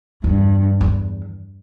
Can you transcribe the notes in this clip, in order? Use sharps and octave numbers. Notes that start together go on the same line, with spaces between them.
E2 G2
E2